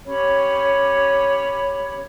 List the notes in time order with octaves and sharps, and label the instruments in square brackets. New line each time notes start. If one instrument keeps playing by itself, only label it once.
[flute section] C#4 G4 C#5 B5